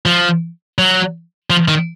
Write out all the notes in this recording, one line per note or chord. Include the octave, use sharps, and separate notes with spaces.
F3
F#3
F3
D#3